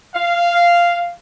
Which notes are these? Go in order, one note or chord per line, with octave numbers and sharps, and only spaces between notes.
F5